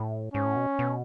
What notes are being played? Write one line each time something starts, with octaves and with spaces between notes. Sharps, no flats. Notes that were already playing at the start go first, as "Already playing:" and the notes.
Already playing: A2
G#2 C#4
A2
B2
B2